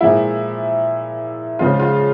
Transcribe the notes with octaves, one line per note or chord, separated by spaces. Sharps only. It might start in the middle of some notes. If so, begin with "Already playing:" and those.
A#2 F3 G#3 E4
C#3 F3 G#3 F4
F4